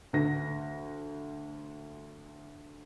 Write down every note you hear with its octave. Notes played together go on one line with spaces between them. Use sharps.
D2 A#6